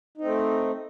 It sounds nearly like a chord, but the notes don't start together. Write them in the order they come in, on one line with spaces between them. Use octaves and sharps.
D#4 C4 A3